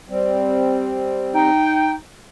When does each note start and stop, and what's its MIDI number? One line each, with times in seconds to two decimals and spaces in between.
0.09 1.50 55
0.09 1.50 60
1.35 1.94 63
1.35 1.94 79